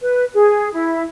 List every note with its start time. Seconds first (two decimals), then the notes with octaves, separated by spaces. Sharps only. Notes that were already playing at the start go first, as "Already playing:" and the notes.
0.01 B4
0.34 G#4
0.73 E4